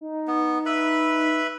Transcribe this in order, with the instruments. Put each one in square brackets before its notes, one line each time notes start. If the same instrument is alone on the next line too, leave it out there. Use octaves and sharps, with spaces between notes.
[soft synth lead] D#4
[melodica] B3
B4 E5 B5